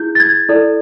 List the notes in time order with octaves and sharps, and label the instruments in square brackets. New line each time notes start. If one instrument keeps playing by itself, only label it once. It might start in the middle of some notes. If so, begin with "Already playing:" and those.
Already playing: [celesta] E4 G#4 G6
A6
G#6
E4 A4 D5